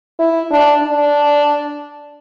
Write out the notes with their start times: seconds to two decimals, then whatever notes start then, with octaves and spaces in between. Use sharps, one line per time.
0.19 E4
0.51 D4
0.83 D4